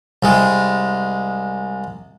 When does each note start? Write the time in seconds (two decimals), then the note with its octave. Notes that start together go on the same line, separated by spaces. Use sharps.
0.23 C2 G#3